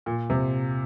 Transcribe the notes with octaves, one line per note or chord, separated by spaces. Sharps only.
A#2
C3